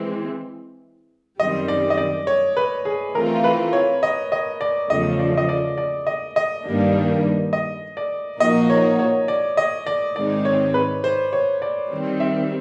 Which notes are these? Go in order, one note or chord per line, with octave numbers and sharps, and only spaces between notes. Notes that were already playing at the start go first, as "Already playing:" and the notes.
Already playing: E3 G#3 C4
F#2 D#3 G3 C4 D#5
D5
D#5
D5
C#5
B4
G#4
E3 A3 C4 F4 A#4
B4
C#5
D#5
D#5
D5
E2 C#3 F3 A3 D#5
D5
D#5
D5
D5
D#5
D#5
G2 D#3 G3 A#3 D4
D#5
D5
A#2 F3 A#3 D#4 F#4 D#5
C#5
C#5
D5
D#5
D5
G#2 D#3 G#3 C4 D#4 D5
C#5
B4
C5
C#5
D5
D#3 G3 C4
E5